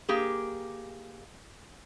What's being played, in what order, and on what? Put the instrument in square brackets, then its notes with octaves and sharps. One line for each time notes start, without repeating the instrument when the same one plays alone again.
[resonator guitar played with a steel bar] A#3 G4 G#4